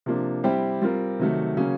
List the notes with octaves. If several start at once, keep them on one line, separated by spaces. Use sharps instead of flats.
C3 F3 A#3 D4
G3 C4 E4 G4 C5
G3 C4 F4 A#4
C3 D#3 F#3 A3
C#3 F#3 A#3 C#4